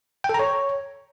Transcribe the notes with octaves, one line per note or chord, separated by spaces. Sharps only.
G5
A4
A#5
C#5